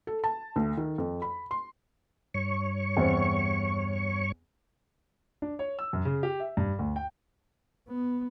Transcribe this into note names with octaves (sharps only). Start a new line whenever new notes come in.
A4
A5
D2
D#3
F2
B5
C6
G2 C#5 C#6
E2 C4
D4
C#5
E6
F#2
C#3
G4
E5
G2
D2
G5
B3